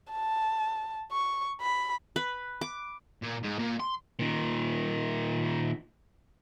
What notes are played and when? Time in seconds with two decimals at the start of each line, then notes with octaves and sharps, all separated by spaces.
0.11 A5
1.12 C#6
1.62 B5
2.16 B4
2.61 D6
3.23 A#2
3.44 G#2
3.59 A#2
3.80 C6
4.19 A#2 D#3